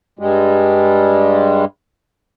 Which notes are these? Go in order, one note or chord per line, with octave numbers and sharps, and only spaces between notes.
G2 G3 G#3